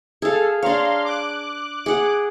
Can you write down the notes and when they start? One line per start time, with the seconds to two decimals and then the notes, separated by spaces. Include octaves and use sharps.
0.22 G#4 A4 F5
0.63 D4 C#5 F5 A#5 C6
1.05 D6 F#6
1.86 G#4 F#5